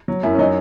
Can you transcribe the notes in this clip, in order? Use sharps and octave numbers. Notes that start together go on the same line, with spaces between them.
F#3
F#2 E4
C#4
F#3 D#4